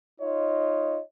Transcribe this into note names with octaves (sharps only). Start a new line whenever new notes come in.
D#4 F4 C#5 D#5